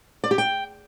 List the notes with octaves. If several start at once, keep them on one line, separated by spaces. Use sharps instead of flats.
D5
G4
G5